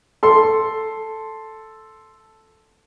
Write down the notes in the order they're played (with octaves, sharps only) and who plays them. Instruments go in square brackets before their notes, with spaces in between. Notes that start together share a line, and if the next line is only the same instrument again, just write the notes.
[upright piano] A4 C6